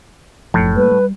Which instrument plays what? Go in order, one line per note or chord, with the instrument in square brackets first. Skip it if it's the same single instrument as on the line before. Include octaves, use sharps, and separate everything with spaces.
[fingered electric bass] F#1 C#2 F3 [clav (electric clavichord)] A2
[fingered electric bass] G3 A#3 [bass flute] B4
[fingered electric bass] G3